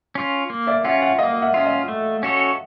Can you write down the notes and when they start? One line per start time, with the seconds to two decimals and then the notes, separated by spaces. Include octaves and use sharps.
0.15 C#4 F4
0.50 A#3
0.67 D5 E5
0.84 C#4 F4 E5 F#5
1.02 E5 F#5
1.19 A#3 D#5 F5
1.42 E5 F#5
1.54 C#4 F4 E5
1.65 D#5 F5
1.88 A3
2.23 C#4 F#4 A4 C#5